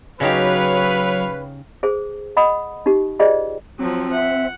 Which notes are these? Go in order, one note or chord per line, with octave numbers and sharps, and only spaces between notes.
C#3 F#3 D#4 G4 B4 C#5 F5
G#4 A4 C5
D#5 F#5 B5 D#6
D#4 G4
F4 G#4 C5 D5 D#5 G5
F3 F#3 C4
E5 F#5